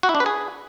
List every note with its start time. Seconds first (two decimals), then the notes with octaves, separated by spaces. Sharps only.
0.03 F#4
0.09 E4
0.15 D4
0.20 B4
0.26 G#4